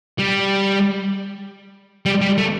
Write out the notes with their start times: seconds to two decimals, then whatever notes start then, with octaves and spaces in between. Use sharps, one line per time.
0.18 G3
2.06 G3
2.21 G3
2.38 A3